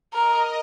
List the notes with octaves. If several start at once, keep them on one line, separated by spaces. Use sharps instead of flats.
A#4 D#5